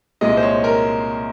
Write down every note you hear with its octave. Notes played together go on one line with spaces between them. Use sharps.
C2 A#2 G#3 D#5
C5
C#5
A#4